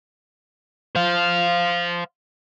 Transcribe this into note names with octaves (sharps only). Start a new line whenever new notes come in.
C5 F5